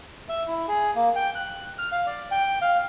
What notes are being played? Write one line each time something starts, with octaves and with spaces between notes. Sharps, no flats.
E5
E4
G#4
A#3
G5
F#6
F6
F5
D5
G5
F5